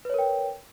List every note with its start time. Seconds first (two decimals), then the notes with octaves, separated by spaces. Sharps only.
0.05 B4
0.10 C#5
0.14 A#4
0.19 G5